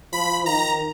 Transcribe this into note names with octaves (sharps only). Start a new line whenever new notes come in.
F3 B5
D#3 A#5